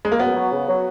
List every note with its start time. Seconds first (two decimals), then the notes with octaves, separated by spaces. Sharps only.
0.05 G#3
0.12 A#3
0.19 F#2 B3
0.35 F#3
0.52 C#3
0.68 F#3